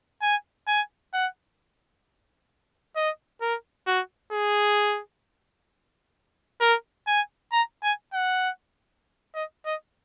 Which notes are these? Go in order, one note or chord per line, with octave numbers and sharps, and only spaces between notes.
G#5
G#5
F#5
D#5
A#4
F#4
G#4
A#4
G#5
A#5
G#5
F#5
D#5
D#5